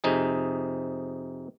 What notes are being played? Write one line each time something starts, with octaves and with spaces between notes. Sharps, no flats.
F2 C3 D#4 G#4